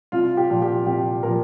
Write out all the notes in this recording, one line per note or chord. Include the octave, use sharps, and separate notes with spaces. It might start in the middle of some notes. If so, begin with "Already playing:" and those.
C2 F4
G4
A#2 F3
G4
C2 G4
A#2 F3 A#4